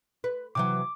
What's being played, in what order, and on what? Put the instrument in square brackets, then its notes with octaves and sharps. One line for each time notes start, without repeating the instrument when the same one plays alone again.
[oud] B4
[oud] C3 E3 F#3 [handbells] D6